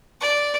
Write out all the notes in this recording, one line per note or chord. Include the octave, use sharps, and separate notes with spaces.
D5